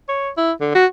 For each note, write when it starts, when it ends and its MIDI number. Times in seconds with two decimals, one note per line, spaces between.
0.09 0.30 73
0.37 0.52 64
0.61 0.70 50
0.75 0.86 66